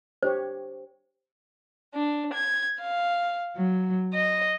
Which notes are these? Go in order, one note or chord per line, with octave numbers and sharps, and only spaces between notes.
D4 G4 C5 C#5
D4
G#6
F5
F#3
D#5